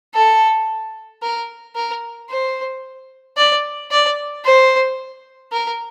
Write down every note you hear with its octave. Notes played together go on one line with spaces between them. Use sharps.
A4
A#4
A#4
C5
D5
D5
C5
A#4